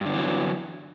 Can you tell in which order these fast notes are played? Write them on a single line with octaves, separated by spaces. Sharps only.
G2 D3 B3 E3 F#3